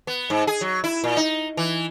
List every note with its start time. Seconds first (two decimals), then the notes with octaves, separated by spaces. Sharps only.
0.07 B3
0.30 G#2
0.47 G#4
0.61 F#3
0.84 E4
1.04 A#2
1.17 D#4
1.57 E3